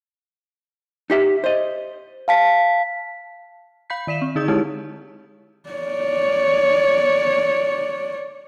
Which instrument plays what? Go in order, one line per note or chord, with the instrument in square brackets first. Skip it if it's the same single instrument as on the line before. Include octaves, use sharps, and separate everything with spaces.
[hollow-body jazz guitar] D#4 G4 E5
C5 D#5
[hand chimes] F5 A5 B6
[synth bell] F5 B5 G6 B6
D#3 D5 B6 E7
C4
D3 D#4 G#4 D#6 G6
G#3 D#4 E4 G4 C#5
[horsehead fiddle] C#5 D5